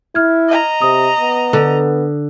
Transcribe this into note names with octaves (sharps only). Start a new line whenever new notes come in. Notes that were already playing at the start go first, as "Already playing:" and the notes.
E4 F6 G#6
D#5 A#5
C3 D#6
B3
D3